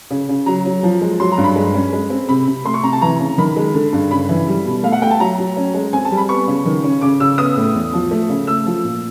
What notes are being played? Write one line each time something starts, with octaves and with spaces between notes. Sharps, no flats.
C#3
C#3
F#3 A#5
F#3
F3
G#3
F#3 C6
A#5
G2
B5
G#3
C#4
G#3
C4
C3 B5
C3
A3 C6
C#6
C3 A#5
A5
E3 A#5
C#3
D#3 B5
G#3
D3
G2
C#3 B5
E3
G3
B2
A3 F5
F#5
A3 G5
A5
F#3 A#5
F#3
C#4
G#3
C4 G#5
A5
G3
B5
B3 C#6
C#3
D#3
C#4
C#3 D6
C#3 E6
B3 D#6
A2
E2
F3
A3
C#3
A3 E6
F3
A#2